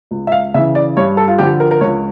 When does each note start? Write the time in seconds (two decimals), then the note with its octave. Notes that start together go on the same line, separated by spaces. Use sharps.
0.11 C#2
0.27 E5
0.32 F5
0.54 C#3 E3 E5
0.75 D5
0.97 G2 C#5
1.17 A4
1.28 F4
1.38 D3 F3 G4
1.60 A#4
1.71 A#4
1.81 C#2 C#5